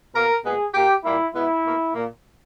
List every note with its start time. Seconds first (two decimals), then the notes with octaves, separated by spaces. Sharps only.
0.14 B2 A#3 A#4
0.45 A#2 G#3 B3 G#4
0.74 A#2 A#3 G4
1.04 A#2 G3 A#3 E4
1.34 B2 G#3 B3 E4
1.64 B2 A#3
1.94 A#2 A#3